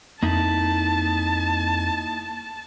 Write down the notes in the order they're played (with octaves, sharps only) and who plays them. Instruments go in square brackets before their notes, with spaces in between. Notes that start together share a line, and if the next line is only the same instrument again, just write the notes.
[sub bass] F2 [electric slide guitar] A#3 D#4 E4 [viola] A5